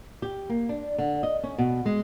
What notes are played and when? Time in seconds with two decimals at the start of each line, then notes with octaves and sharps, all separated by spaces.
0.22 G4
0.49 A#3
0.69 D4
0.98 D3
1.23 D#5
1.44 C#4
1.58 B2
1.86 G#3